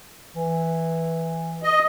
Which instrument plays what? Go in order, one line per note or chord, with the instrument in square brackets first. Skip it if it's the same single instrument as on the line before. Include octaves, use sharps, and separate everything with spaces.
[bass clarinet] E3
[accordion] D#5